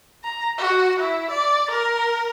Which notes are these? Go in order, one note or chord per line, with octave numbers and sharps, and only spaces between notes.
A#5
F#4
E4
D5
A#4